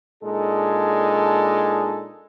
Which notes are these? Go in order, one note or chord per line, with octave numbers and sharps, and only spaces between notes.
A#2 G#3 D4 D#4 G#4 A4